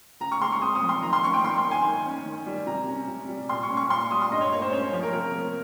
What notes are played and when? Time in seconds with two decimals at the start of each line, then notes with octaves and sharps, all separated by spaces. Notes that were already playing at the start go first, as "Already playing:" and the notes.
0.20 C#3 A#5
0.32 C#6
0.41 G#3 C6
0.52 C#6
0.61 C4 D#6
0.75 D#6
0.82 F3
0.89 C6
1.02 D#3 A#5
1.13 C6
1.24 C#4 C#6
1.34 G5
1.44 D#3 C6
1.58 C6
1.64 A#3
1.71 G#5
1.85 D#3
2.05 C#4
2.26 D#3
2.46 G3
2.67 C3 A#5
2.88 C#4
3.08 C3
3.28 G3
3.49 A#2 C6
3.63 C#6
3.70 C#4
3.77 C#6
3.90 A#2 C6
4.11 G3 D#6
4.22 C6
4.32 G2 D#5
4.41 C#5
4.52 A#3 C#5
4.62 C5
4.72 C#4 C#5
4.93 F3 C#5
5.03 A#4
5.13 C3 A#4
5.33 A#3